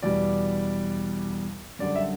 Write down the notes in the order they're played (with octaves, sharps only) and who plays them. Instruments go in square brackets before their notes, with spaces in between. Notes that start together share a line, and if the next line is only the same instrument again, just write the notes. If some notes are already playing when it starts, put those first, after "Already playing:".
[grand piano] E2 B2 G3 D5
F#2 D3 G3 D5
E5